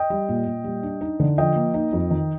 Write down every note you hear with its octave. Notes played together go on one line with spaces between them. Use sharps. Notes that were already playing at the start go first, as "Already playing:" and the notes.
Already playing: D#5 G5
G3
A#2
A#2
G3
D4
D#4
D3
F3 D#5 G5
A#3
D#4
F2
D#3